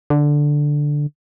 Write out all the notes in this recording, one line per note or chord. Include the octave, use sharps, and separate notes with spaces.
D3